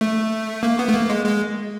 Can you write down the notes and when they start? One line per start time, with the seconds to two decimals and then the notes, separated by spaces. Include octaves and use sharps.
0.01 A3
0.63 A#3
0.79 B3
0.89 A3
0.94 A#3
1.10 G#3
1.26 G#3